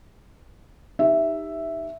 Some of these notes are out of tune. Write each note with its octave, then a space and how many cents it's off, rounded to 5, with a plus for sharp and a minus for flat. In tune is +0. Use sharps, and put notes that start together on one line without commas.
D#4 +0 G4 +10 E5 +0